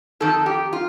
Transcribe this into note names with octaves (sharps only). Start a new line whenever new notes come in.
F2 D#3 A4
G4
F4